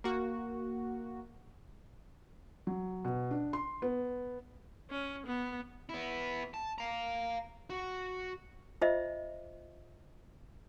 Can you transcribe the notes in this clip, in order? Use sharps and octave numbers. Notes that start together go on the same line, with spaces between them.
A#3 F#4
F#3
B2
D4
C6
B3
C#4
B3
B3 E4
A5
F5 A#5
F#4
F4 C5 D#5 E5